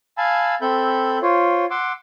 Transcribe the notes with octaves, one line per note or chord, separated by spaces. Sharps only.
F5 G#5 A5 B5 E6
C4 A4 E5 B5 G6
F4 C5 C#5
F#5 C6 D6 E6